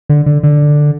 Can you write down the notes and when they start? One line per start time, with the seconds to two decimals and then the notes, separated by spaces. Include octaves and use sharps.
0.09 D3
0.26 D3
0.43 D3